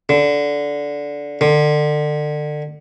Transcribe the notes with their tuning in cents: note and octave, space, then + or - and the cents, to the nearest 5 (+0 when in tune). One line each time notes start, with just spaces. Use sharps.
D3 -15
D3 +30